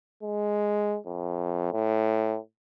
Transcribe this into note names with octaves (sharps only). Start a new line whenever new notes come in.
G#3
F2
A2